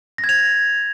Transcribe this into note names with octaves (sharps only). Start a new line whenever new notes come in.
A#6
G#6
F7